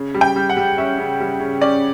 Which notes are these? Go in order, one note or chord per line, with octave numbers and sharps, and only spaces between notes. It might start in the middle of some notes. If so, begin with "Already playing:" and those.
Already playing: C#3
G3
G5
G3
F#5
G3
C#4 E5
C#3
G3
C#3
C#4 D5